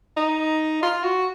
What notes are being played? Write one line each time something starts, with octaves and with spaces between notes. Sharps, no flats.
D#4
F4
F#4